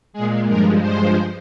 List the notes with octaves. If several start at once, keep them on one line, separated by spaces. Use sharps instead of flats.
A#2 G#3 G#4
G2 F3 G#3 A#4
G2 F3 G#3 C5